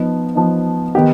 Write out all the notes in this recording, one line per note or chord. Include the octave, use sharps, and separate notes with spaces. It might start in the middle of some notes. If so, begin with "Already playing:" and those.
Already playing: F3 B3 D#4
F3 B3 D#4
D#3 B3 D#4 G4